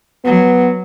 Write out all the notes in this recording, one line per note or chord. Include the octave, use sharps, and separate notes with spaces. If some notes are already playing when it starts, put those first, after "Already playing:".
F#3 B3